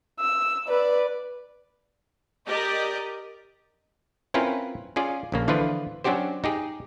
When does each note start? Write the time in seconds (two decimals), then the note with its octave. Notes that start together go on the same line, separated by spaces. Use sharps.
0.19 E6
0.68 B4 D5
2.46 G4 A#4 D5 D#5
4.34 C4 C#4 E4 F4 A#4 B4
4.96 C#4 F4 G#4 D5
5.32 A#1 C#3 A#3
5.48 D3 E3 F3 D4 F4 B4
6.04 F#3 C#4 D4 F#4 G4 C5
6.44 D#4 G4 G#4